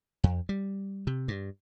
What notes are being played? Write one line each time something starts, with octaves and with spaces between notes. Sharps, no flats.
F2
G3
C3
G2